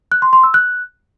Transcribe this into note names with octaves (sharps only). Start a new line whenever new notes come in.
F#6
C6
C6
E6
F#6